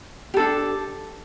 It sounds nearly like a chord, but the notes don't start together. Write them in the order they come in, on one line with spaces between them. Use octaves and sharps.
G4 A4 D4